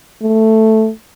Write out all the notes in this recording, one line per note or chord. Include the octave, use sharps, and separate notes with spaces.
A3